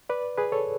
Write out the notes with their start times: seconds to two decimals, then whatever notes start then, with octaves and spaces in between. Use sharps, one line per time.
0.09 B4 D5
0.37 G#4 B4
0.52 A4 C#5